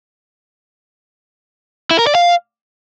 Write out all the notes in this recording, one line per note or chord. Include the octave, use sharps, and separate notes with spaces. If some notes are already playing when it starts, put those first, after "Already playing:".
E4
A#4
D5
F5